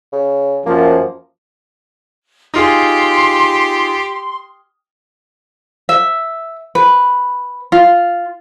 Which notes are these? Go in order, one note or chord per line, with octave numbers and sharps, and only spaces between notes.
C#3
F#2 F3 A#3
D#4 F4 G4 G#4 C6
E5
B4
F4